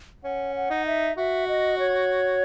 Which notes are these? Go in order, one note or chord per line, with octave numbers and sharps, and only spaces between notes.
C#4 F#5
F#5
D#4
E5
F#4 E5
D#5
C#5